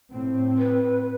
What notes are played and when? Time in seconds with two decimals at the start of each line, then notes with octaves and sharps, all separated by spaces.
0.12 A2 C4
0.58 B4